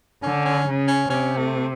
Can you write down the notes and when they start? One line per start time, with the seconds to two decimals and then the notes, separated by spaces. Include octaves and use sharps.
0.23 D3 C#4
0.45 C#4
0.67 C#3
0.87 C#4
1.09 C3 C#4
1.37 A3